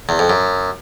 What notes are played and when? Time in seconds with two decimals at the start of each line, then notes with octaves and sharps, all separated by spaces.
0.09 E2
0.19 F2
0.30 F#2